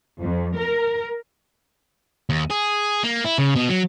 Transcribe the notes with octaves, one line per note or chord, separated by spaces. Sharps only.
F2
A#4
D#2
G#4
A#3
E4
C#3
B2
F#3